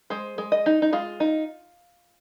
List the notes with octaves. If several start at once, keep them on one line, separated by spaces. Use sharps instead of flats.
G#3 C5
G#3
D#5
D#4
D#4
G#3 F4
D#4